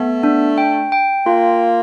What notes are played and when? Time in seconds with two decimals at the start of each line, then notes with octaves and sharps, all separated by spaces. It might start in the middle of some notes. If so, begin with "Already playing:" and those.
Already playing: A3 B3
0.23 D4
0.58 G5
0.92 G5
1.26 A#3 F4